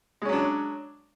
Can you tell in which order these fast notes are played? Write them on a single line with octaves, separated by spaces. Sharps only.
G#3 C#4 F#3 D4